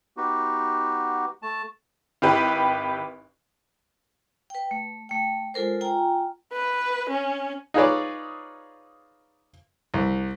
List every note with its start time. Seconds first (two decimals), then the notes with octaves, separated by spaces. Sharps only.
0.17 B3 D#4 F#4 G4
1.42 A3 A5
2.22 G#1 E4 G4 B4
4.50 B4 G5
4.71 A3
5.09 A3 G5
5.54 G#3 F4 A4 A#4 C5
5.81 F4 G5 G#5 A#5
6.53 B4
7.09 C#4
7.74 D#4 F4 G#4 B4 C#5 D5
9.94 C2